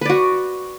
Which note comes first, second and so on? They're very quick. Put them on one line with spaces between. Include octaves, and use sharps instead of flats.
B4 D5 F#4